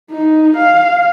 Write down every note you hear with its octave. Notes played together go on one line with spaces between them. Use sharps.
D#4
F5